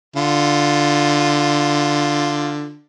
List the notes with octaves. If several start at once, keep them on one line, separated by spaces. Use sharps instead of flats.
D3 F4